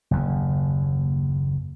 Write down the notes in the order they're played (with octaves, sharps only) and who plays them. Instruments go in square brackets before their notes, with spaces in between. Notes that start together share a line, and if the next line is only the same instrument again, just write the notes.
[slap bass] F#1 D#2